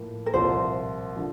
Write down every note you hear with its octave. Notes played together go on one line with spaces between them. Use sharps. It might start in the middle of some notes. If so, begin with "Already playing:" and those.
Already playing: A2 F3 A#3
A#4
C2 A#2 F3 A#3 F4 C5
D3 F3